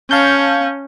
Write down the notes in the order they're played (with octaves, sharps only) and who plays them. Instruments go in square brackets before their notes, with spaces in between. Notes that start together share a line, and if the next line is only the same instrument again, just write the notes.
[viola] C#4 [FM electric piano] F5 A5 G6